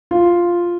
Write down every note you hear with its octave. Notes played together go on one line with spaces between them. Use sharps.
F4